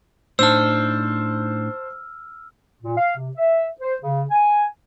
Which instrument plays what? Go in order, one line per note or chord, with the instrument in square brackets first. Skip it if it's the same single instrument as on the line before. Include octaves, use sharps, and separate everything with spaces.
[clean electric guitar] A2 D4 D#4 [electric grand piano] C5 A5 [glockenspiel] E6 F6
[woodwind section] A#2
F5
C3
E5
C5
C#3
G#5